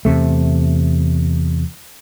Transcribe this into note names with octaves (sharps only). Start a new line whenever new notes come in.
E2 C3 A3